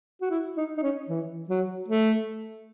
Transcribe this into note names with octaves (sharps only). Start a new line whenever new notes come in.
F#4
E4
D#4
D#4
C#4
E3
F#3
A3